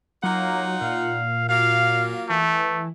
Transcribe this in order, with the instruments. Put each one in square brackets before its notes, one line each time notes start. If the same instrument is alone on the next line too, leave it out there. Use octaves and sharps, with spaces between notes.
[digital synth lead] F#3 [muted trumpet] A#3 [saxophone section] D#4 F4 F#5
[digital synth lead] A#2 [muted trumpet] F5
[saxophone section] F#3 A#3 F4 [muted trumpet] F5
[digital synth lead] E3 [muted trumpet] A3